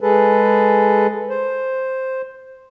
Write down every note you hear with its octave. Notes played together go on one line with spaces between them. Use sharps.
G#3 G#4 A4 B4
C5